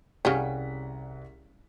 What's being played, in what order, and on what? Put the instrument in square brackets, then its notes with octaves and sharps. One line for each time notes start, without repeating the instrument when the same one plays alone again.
[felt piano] C2 F#5 B6 [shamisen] C#3 G3 C#4